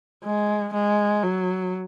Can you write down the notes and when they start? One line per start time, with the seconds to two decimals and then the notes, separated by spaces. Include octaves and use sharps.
0.24 G#3
0.74 G#3
1.23 F#3